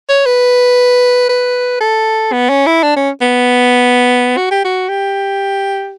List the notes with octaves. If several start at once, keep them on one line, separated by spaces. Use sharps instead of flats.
C#5
B4
B4
A4
B3
C#4
E4
D4
C#4
B3
F#4
G4
F#4
G4